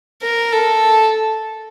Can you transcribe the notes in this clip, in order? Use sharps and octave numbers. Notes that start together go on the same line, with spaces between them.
A#4
A4